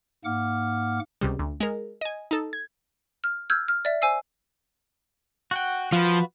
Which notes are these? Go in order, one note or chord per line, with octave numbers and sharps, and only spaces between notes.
G#2 A#3 F#5 D6 F6
C#2 C3 G3
D2
G#3 A#4
D#5 G#5
D#4 A4
G#6
F6
E6 F6 G6 G#6
F6
D5 E5
C5 G#5 E6 C7
F#4 F#5 G5
F3 F4 F#4 B4